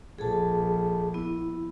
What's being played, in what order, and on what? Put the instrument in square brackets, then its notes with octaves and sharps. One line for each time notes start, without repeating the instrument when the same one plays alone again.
[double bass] A#1 [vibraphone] G#4 A4 A5
[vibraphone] B3 E4